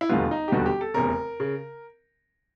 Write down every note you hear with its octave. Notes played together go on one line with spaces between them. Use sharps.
E4
E1 D#2 D3 G3 B3 F4
D#4
G4
E1 D#2 D3 G3 B3 F#4
G4
A4
F1 E2 C#3 A#4
C#3